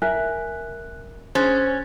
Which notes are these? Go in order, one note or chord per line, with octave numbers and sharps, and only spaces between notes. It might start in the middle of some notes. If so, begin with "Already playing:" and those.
A#4 E5 G#5 F#6
C#4 G#4 C5 F#6 A6